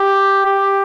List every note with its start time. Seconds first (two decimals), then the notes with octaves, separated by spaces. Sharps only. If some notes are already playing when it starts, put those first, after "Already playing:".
Already playing: G4
0.46 G4